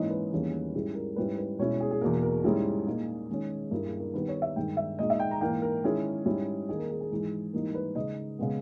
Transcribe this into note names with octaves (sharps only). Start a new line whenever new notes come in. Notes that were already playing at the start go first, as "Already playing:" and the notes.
Already playing: G#2 E3 A#3 C#4 E4 D#5
B4
E2 D#3 G3 A#3 C#4
G#2 G3 C#4 E4 G#4
A#4
G#2 G3 C#4 E4 B4
B4
B2 G#3 C#4 E4 C#5
G#4
G#4
E2 B2 A#3 A#4
A#4
G#2 G3 C#4 E4 G#4
A#2 A#3 D#4
D#3 G#3 C#4
G2 G3 A#3 E4 A#4
G#4
A#4
D#3 G3 B3 B4
C#5
E5
G2 D#3 G#3 G5
E5
A#2 G#3 D#4 D#5
E5
G5
A#5
G#2 E3 A#3 G5
A#4
D#3 G#3 C#4 E4 G#4
G#2 G3 C#4 E4
D#3 A#3 D#4 G#4
A#4
G#4
G#4
G#2 E3 G#3
G#2 E3 G3 A#3 D#4 A#4
B4
C#3 G#3 D#4 D#5
C#3 G#3 B3